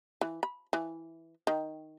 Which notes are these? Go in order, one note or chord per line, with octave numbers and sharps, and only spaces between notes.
E3
B5
E3
D#3